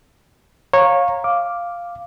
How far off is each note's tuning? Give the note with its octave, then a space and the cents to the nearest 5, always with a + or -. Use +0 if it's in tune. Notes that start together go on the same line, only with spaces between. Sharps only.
C#5 -15 F5 +20 A#5 +0
F5 +0 D6 +0